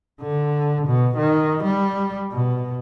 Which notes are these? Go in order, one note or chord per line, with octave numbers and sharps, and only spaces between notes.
D3
B2
D#3
G3
B2